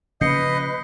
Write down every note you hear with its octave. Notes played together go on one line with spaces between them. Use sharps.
C#3 F3 A#3 B4 D#5 G6 C7 C#7